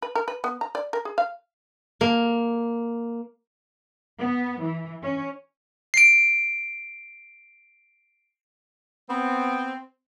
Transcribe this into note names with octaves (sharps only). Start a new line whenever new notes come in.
B4
A#4
B4
B3
A#5
D5
A#4
G#4
F5
A#3
B3
E3
C#4
C7 D7
B3 C4